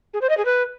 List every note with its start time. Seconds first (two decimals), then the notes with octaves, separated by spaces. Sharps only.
0.14 G#4
0.22 C5
0.29 D#5
0.37 G#4
0.45 B4